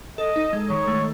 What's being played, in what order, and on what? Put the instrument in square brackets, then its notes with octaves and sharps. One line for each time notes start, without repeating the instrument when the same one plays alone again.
[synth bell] A4 [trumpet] D#5
[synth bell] D#4
G#3
[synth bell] D#3 [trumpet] C#5
[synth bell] A3